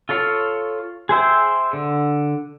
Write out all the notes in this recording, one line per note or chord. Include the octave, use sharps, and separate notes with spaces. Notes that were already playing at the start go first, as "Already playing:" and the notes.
F4 A4 C#5 F5
G#4 C5 E5 G5
D3